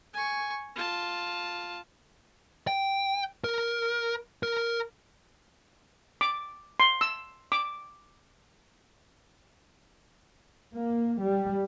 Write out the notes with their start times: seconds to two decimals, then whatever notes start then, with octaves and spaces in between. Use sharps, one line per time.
0.14 G#5 C#6
0.75 F4 A5
2.67 G5
3.44 A#4
4.43 A#4
6.21 D6
6.80 C6
7.01 E6
7.52 D6
10.74 A#3
11.20 G3